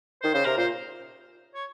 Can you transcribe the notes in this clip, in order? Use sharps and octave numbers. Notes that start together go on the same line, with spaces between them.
D#3 C5
C#3 C5
C3 A#4
A#2 C5
C#5